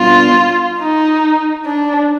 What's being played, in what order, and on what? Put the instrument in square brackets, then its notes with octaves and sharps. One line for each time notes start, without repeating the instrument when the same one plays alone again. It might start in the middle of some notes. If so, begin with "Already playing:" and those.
Already playing: [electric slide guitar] B2 G3 B3 D4 [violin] F4
[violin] D#4
D4